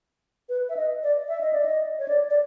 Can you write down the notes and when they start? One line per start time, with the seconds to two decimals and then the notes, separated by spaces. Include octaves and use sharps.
0.49 B4
0.69 E5
0.77 D#5
1.03 D5
1.29 E5
1.41 D#5
1.53 D5
1.65 D#5
1.99 C#5
2.08 D5
2.30 D5